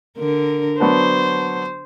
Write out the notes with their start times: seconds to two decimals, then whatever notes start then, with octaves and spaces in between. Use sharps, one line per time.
0.18 D3 A#4
0.80 F#3 B3 D4 C5